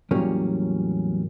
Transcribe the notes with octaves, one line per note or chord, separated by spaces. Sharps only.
E2 A2 F#3 G3 A#3 C#4